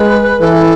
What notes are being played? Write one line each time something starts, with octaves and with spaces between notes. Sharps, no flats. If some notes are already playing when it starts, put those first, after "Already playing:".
Already playing: G#3 B4
E3 A4